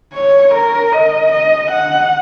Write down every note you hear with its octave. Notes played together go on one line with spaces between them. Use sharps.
C#5
A#4
D#5
D#5
F#5